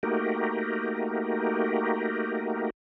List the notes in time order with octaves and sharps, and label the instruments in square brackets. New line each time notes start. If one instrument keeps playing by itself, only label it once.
[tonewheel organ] A3 A#3 D#4 F#4 G4 A#4